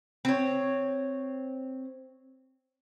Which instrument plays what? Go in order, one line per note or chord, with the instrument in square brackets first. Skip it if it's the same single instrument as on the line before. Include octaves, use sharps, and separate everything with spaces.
[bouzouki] C4 C#5